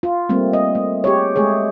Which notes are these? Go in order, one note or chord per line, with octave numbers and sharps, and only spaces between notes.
F4
G3 A3 A#3 C4
D#5
A3
G4 G#4 C#5
G#3 A3 G#4 C#5